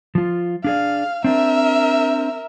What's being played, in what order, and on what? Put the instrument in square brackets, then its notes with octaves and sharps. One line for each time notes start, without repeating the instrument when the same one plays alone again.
[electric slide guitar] F3 F4
[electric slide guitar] D4 G#4 D5 [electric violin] F5
[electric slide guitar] C4 D4 [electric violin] A#4 E5